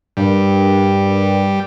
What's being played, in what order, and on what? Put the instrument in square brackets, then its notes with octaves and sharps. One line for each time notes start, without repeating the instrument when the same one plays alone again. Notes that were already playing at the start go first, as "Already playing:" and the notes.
[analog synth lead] G2 [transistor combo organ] G3 [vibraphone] D4 A#4